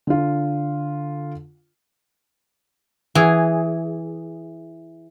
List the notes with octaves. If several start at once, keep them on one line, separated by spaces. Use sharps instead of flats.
D3 F4
E3 G#4